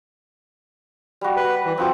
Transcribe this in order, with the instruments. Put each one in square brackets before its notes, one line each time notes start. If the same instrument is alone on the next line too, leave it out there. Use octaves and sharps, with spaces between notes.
[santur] G3 F#4
[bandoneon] B4
E3
[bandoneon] F3 [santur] C4 F#4 A4